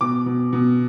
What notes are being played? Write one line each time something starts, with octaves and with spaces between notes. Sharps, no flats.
B2 D6
B2
B2